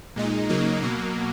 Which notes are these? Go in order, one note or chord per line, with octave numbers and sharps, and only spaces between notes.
A#2 G#3 D#4
C#3 F#3 A#3 D#4
B2 F#3 A#3